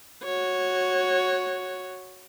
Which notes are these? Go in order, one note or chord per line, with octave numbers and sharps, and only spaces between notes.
F#4 C#5